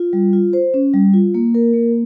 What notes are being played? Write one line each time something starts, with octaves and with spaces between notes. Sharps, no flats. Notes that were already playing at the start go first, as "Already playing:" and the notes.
Already playing: F4
G3
F4
C5
C#4
G3
F4
A#3
A#4
A#3